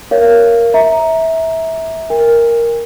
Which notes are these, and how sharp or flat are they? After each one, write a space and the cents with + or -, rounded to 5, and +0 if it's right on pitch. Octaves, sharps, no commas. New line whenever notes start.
A#4 +0 C#5 +15 F5 -25
E5 -20 A#5 +0
A#4 +0 G#5 -45